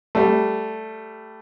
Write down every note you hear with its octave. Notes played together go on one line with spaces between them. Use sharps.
G3 A3